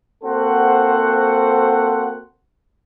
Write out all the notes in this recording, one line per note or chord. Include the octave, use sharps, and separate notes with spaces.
A#3 C4 F#4 A4 C5 F#5